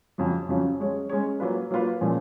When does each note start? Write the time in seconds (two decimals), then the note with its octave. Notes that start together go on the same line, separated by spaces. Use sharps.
0.18 F2 C#3 F#3 C#4 F4
0.49 F2 C#3 F#3 C#4 F4
0.80 G#3 C#4 G#4 C#5
1.09 G#3 C#4 G#4 C#5
1.40 F#3 A#3 F4 B4
1.71 F#3 A#3 F4 B4
2.01 A#2 F3 G#3 C#4